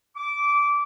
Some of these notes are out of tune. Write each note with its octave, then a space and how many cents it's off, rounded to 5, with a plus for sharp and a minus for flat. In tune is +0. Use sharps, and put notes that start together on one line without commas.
D6 -20